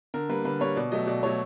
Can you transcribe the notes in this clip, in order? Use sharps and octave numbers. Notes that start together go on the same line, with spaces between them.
D3 A#4
G3 A#3 B4
D3 B4
G3 A#3 C#5
B2 D5
F#3 A3 D#5
B2 D5
F#3 A3 C#5